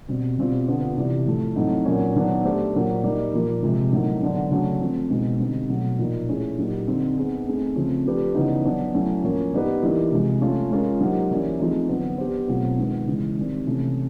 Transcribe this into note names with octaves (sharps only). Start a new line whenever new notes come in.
B2 G3 C4
B2 G3 C4 F4
D3 G3 B3 D4 F4
C3 E3 G3
A2 F3 A3
A2 F#3 A3 C4 D#4
A#2 F#3 A#3 C#4
D#3 F#3 B3 D4
A3 D4 G4 C5
A#2 F#3 A#3
G3 A#3 D#4
A#2 F3 A#3
C3 F3 G#3
A2 F#3 A#3 D#4
D3 F#3 B3 D4
C#3 F#3 A3 D4 F#4
F3 A3 C4
B2 G#3 B3 D#4
D3 G3 C4 D#4
B2 F#3 A3
A#2 F3 A#3 D#4
A3 C#4 E4 G#4
A#2 F#3 A#3 D#4 G4
D3 G3 C4 D#4
B3 D#4 G#4
A3 C4 D#4 G#4
C#3 F3 A3 C4
F3 A3 D4 G4 B4
C#3 E3 G3 B3 D#4
F#3 B3 D4
F#3 A3 C#4 E4
A2 F3 A#3 C#4
G3 B3 D#4 G4 B4
E3 G3 A#3 D#4 G4
C3 F3 G#3
A3 C#4 F4
G#3 C#4 F4 A#4
F#3 A#3 D#4 G4 C5
E3 G3 A#3 C#4 E4
F3 A3 C4 D#4 G#4
D3 F#3 B3
B3 D4 G4 C5
B2 F#3 A3 C4 F4
D#3 G#3 B3
C#3 E3 G#3
D#3 G3 C4
C3 E3 A3 C#4 E4